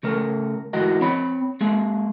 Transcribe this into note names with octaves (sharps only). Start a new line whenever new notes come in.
C#3 A3 A#4
D2 G#2 E3 F#4 A#4 D#5
C4 C#5 B5
G#3 A#3 G#4